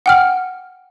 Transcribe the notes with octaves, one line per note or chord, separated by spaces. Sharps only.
F#5 G5 F6